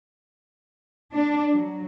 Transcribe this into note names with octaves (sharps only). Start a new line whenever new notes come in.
D4
F#3